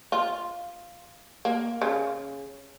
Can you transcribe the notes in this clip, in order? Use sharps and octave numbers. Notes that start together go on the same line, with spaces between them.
F4
A#3
C#3